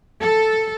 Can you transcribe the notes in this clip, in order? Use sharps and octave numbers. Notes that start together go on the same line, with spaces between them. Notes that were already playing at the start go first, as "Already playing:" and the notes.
A4